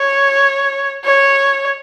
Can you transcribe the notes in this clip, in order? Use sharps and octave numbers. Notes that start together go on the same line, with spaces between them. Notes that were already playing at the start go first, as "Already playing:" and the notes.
Already playing: C#5
C#5